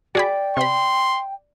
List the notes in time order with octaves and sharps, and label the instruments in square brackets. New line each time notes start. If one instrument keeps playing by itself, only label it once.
[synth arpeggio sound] F#4 G#4 B5 [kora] D5 [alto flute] G5
[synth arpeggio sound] C3 B5 [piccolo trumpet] C6